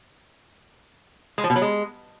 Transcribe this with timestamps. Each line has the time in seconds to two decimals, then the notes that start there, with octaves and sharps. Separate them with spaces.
1.38 G#3
1.44 F3
1.50 B2
1.56 F#3
1.62 G#3